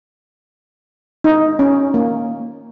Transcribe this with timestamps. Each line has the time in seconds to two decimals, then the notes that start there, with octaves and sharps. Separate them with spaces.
1.24 D#4
1.59 C#4
1.94 A#3